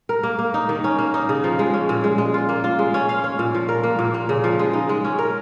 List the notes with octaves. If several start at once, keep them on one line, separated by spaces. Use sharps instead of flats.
A#4
A#3
A#3
D#4
D#3
C#4
A#3
D#4
C#3
F3
G#3
C#4
A#2
G#3
G#3
F4
A#3
F4
G#3
C#4
F5
C#4
A#2
F3
A#4
A#3
A#2
A#3
C#3
F3
G#3
D#4
G#3
C#4
A#4